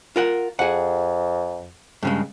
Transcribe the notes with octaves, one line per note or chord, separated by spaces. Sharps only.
F4 A#4 F#5
F2 G#4 F#5
G2 C#3 G#3